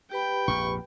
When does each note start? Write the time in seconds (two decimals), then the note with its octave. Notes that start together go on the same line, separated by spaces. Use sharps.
0.12 G4 B4 G5 B5
0.48 A#1 F2 G#2 C#6